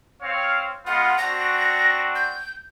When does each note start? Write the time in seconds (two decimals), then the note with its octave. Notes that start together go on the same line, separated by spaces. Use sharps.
0.22 C4 C#5 F5
0.86 G#3 B3 F4 F#5
1.18 C4 D4 F#4 A#6
2.15 G6